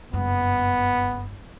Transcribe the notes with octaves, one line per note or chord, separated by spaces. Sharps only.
F#1 G2 B3